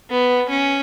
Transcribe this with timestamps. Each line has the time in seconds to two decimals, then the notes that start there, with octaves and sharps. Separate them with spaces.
0.10 B3
0.49 C#4